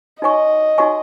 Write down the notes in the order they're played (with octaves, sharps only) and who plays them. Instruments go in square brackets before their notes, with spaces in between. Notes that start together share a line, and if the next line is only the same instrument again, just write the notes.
[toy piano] D#4 F#4 C#5 G#5 C#6 [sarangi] D#5
[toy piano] D#4 F#4 C#5 G#5 C#6